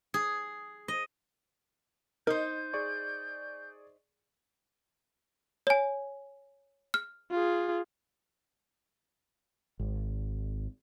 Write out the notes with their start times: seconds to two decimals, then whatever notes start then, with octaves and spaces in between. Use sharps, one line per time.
0.14 G#4
0.88 D#5
2.27 D#4 A#4 C5 G6
2.73 G#4 D5 C#6
5.67 C#5 G#5
6.94 F6
7.31 F4 G#4
9.79 G#1